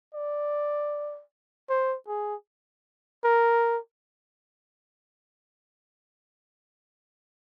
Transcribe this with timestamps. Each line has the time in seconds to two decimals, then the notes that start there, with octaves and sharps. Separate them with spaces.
0.14 D5
1.69 C5
2.08 G#4
3.24 A#4